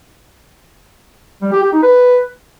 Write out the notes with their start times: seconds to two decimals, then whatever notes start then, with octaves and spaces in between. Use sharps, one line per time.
1.42 G3
1.52 G4
1.62 G4
1.73 D#4
1.83 B4